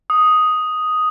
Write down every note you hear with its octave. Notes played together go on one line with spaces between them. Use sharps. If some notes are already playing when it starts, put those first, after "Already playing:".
D#6